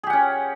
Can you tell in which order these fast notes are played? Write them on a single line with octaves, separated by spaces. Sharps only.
G#4 G4 F#5 C#4